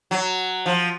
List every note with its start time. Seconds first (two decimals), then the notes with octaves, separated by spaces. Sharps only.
0.11 F#3
0.66 F3